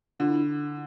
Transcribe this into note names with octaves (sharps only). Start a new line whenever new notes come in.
D3 F4
E4